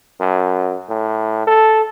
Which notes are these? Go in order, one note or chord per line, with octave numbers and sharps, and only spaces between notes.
F#2
A2
A4